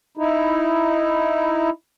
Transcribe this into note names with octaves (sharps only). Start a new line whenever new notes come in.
D#4 E4